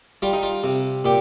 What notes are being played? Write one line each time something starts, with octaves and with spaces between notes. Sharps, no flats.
G3 F4
D#4
F4
C3
A#2 G4